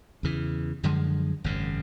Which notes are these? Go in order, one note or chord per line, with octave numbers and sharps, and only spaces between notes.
E2 C#3 E3
F#2 D3 F3 G#3
G#1 F#2 C#3